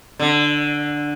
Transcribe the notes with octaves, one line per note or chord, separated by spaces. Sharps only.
D3